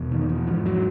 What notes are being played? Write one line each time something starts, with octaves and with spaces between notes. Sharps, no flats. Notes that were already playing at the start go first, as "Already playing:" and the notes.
Already playing: E2 B2
D#3
E3
G#2 F3
F#3